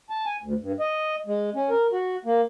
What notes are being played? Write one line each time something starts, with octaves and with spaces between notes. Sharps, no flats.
A5
G#5
D2
G2
D#5
G#3
C#4
A#4
F#4
A#3